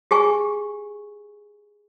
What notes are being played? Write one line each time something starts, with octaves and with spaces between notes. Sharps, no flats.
G4 G#4 G#5 C#6